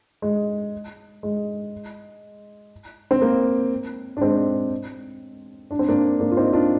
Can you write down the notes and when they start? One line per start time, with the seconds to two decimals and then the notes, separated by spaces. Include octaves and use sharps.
0.22 G#3
1.23 G#3
3.11 C4
3.22 A#3
4.17 D4
4.21 G#3 C4
5.71 D4
5.79 C4
5.89 A#3 D4
6.20 A#3 D4
6.32 F4
6.37 C4 D#4
6.53 D4 F4